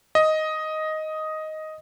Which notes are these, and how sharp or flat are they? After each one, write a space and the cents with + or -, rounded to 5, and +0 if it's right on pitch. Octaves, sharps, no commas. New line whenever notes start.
D#5 +5